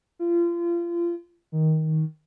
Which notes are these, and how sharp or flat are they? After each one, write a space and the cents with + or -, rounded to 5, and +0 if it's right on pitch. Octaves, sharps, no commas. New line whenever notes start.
F4 -30
D#3 +15